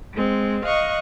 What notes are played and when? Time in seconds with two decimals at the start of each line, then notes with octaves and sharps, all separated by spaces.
0.14 G#3 C4
0.66 D#5 F5 C#6 F#6